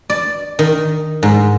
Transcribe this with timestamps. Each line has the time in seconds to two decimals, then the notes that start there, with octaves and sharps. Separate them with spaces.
0.10 D5
0.59 D#3
1.23 G#2